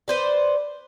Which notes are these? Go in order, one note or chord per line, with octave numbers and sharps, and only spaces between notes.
B4 C5 D5